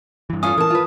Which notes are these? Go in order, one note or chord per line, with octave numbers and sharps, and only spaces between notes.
G2 E3
E2 C#4 F4 A4 F5 G#5 D#6
E3 A#4 A5
F4 B4